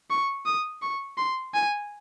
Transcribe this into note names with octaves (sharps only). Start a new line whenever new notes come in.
C#6
D#6
C#6
C6
G#5